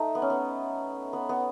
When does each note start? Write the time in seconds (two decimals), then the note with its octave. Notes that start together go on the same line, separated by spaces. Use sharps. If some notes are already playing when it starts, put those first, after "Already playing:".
Already playing: A3 D#4
0.15 B3
0.22 C#4
0.30 B3
1.13 B3
1.29 B3